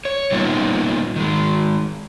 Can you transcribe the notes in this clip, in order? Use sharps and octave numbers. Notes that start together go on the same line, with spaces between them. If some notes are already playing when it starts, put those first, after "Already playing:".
C#5
B2 G3 A#3 B3 D#4 F4
D#3 G#3